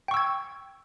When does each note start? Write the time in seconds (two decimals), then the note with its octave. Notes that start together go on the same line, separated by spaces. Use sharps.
0.08 G5
0.11 C#6
0.14 E6
0.17 G#6